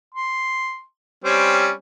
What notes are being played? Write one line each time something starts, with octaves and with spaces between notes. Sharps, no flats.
C6
G3 C4 C#4